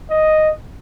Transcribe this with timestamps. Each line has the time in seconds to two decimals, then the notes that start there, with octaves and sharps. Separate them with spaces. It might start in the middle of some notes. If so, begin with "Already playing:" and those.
0.10 D#5